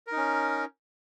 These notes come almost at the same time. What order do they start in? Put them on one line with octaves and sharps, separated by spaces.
A#4 D#4 C#4